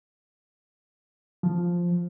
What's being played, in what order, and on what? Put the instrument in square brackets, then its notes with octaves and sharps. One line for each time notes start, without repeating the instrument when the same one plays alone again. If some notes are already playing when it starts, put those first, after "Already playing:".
[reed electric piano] F3